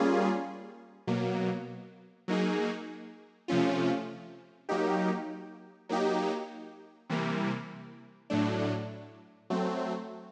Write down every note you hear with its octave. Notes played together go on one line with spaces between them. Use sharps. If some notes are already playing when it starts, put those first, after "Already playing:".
Already playing: G3 A#3 C#4 F4 G#4
B2 F#3 A#3
F#3 A#3 D#4 G#4
C3 F3 A3 C#4 F4
F#3 A#3 D#4 G4
F#3 A#3 D#4 G4
C3 E3 G3 A#3
A2 F#3 A3 D4
F#3 A3 C4